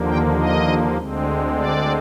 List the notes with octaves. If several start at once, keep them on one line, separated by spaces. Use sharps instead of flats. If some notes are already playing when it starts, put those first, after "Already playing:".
Already playing: D#2 D3 F3 A#3
G5
D#5
D2 D3 G#3 C4
D5